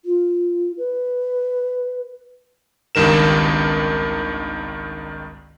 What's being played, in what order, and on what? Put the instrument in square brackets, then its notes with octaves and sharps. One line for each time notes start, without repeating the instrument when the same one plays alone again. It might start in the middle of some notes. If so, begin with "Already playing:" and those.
[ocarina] F4
B4
[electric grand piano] G#1 C#2 G2 D#3 A#4 E7